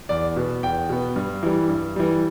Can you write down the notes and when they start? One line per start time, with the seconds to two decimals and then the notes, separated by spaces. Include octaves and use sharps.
0.09 E2 D5
0.36 B2 B3
0.63 E2 G5
0.89 B2 B3
1.16 G2
1.43 E3 G3
1.68 G2
1.96 E3 G3